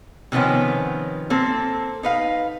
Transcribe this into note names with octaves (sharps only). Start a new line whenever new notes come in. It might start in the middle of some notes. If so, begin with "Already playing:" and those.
C3 D#3 F3 B3 C#4
A#3 C4 A4
D#4 B4 F5